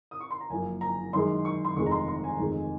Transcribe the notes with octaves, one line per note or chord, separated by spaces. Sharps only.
D#6
C#6
C6
A#5
F#1 F#2 F3 A#3 G#5
A#5
F#2 D#3 G#3 C6
C#6
C6
F1 F2 D#3 G#3 C#6
A#5
C6
C6
G#5
F1 F2 D#3 G#3